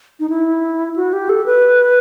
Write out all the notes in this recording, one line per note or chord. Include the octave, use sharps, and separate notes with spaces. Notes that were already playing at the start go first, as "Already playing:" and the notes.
D#4
E4
F#4
G4
A4
B4